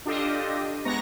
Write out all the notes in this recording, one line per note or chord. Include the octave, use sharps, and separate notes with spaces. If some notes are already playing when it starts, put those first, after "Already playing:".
D4 F4 G4 A4 D#5
G#3 B3 A#5 C#6 A#6